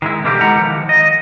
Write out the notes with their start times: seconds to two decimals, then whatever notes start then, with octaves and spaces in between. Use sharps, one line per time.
0.02 D#3 G#3 E4
0.24 B2 D3 E3 G3 A#3 G4
0.41 G#3 A3 E4 G4 F#5 A#5
0.58 D#3 F3
0.89 D#5